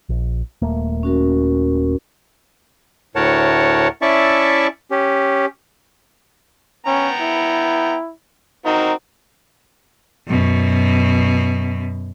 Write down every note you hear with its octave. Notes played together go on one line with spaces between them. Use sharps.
A#1
D#1 A3 A#3
C#4 F#4 A#4
D2 A2 A#4 C#5 F#5 A5
C#4 E4 D5 E5 A5 C#6
C#4 G4
B3 C#4 G5 A#5
E4
C4 D#4 F#4 A#4
F#2 B2